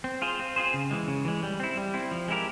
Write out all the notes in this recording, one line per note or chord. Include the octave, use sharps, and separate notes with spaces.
C4
F4 G#4 C5
C4
F4 G#4 C5
C#3
E3 G#3
C#3
E3 G#3
G3
C4 E4
G3
C4 E4
F3
G#3 E4 G4 A#4